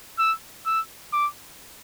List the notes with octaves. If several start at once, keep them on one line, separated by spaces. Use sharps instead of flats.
E6
E6
D6